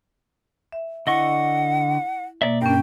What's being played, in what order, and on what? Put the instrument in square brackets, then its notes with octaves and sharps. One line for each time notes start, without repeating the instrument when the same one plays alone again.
[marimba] E5
[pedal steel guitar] D3 D#5 C#6 [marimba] E4 [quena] F#5
[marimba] B2 A#3 [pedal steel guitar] D5 E5
[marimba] G2 C#4 [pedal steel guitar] D4 A#4 [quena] G5